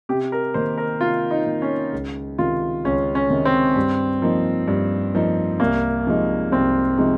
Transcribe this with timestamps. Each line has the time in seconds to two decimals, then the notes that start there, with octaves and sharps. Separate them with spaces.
0.09 C3 G4
0.32 A#4
0.54 D#3 A#3 C5
0.78 A#4
1.00 C3 F4
1.31 D#4
1.47 D#3 A#3
1.62 C#4
1.92 C#2
2.38 C3 D#3 F4
2.84 C#2 C#4
3.15 C#4
3.30 C3 D#3
3.45 C4
3.76 G2
4.22 F3 A#3 D#4
4.68 G2
5.14 F3 A#3 D#4
5.60 C2 A#3
6.06 C3 F3 G#3 D#4
6.52 C2 C4
6.98 C3 F3 G#3 D#4